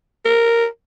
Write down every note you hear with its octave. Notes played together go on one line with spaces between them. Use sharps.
A#4